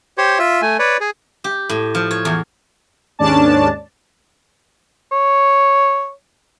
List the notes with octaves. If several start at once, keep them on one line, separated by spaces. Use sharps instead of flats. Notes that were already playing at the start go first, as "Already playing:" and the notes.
G4 C5 C#5
F4 E5
A3 G#5
B4 C#5 D5
G#4
G4
A2
F3
C#5
E2
D#2 G#2 C#4 D4 D5 A5
C#5